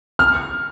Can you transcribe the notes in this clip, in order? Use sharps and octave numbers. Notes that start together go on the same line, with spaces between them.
F6